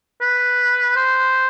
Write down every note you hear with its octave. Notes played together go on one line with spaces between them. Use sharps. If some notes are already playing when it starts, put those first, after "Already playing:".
B4
C5